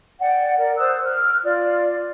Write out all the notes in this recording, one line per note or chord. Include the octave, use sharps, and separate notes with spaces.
D5 F#5 G5
A#4 D5
C5 D#6 E6 F#6
F6 F#6
F4 D5